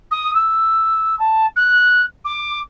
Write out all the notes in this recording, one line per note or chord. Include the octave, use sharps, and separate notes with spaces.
D#6
E6
A5
F#6
D6